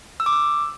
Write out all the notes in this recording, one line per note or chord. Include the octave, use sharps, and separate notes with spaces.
E6
D6
E6